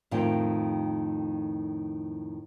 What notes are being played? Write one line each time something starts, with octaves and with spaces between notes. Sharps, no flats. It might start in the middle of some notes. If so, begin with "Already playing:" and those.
F2 A2 D#3 F4 G5